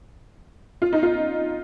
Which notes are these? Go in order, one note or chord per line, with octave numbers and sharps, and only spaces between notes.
F4
D#4
F4